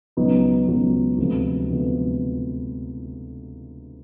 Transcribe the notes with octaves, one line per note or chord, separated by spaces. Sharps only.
C#2 B2 F#3 B3 D#4
C#2 B2 F#3 B3 D#4
D2 C3 F3 G#3 B3
D2 C3 F3 G#3 B3